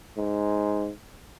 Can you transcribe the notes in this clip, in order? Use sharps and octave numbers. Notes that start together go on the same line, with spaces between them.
G#2